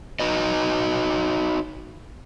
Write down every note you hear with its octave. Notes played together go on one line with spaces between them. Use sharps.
D#4 F#4 B4 D#5